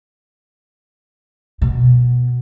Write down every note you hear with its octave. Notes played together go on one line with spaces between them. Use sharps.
B2